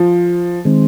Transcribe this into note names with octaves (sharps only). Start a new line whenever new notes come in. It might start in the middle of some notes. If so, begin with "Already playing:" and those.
Already playing: F3
D#3 G#3 C4